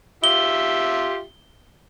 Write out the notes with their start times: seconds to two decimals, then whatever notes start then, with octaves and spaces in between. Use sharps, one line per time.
0.24 F4 G4 E5 G7